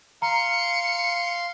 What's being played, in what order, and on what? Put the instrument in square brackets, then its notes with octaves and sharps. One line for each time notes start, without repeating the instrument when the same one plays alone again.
[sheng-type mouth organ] F5 C6 [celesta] A#5 [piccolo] C#7